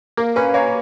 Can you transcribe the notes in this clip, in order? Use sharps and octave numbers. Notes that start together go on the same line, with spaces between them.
A#3 A#4
C#4 B4
A#3 C#5